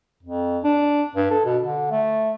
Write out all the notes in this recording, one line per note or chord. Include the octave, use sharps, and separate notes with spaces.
F2
D4
G2
A4
B2
D3
A3